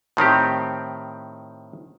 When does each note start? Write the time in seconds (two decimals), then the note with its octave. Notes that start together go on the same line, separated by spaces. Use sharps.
0.17 A2 D#3 C4 G4